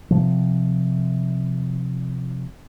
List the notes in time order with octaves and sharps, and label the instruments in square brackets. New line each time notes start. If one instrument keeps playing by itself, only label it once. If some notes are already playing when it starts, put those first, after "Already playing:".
[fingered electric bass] C3 F3